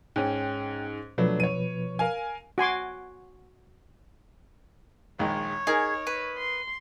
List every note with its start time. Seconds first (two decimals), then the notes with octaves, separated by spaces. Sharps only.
0.16 G#2 C#4 G5
1.18 B2 F3 F#3 A3 D4 B4
1.40 C#5 D#7
1.99 A#4 F5 G#5
2.58 F#4 G#5 C6 D6
5.19 A#1 D#3 G#3 C#5
5.67 D#4 G#4 A#4
6.07 B4
6.38 C6